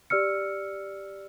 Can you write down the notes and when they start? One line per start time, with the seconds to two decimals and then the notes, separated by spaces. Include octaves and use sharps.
0.10 G4 D5 E6 F6 C#7